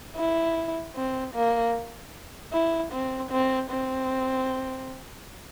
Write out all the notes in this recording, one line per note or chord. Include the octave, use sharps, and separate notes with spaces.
E4
C4
A#3
E4
C4
C4
C4